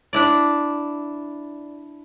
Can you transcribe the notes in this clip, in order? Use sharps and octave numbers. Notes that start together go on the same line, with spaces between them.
D4 E4 D5